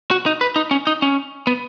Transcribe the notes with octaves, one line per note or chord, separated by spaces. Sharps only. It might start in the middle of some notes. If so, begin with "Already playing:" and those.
F#4
D#4
B4
D#4
C#4
D#4
C#4
B3